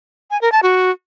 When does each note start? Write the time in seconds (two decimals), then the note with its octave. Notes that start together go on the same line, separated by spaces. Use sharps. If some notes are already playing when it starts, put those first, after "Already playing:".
0.31 G#5
0.41 A#4
0.52 A5
0.63 F#4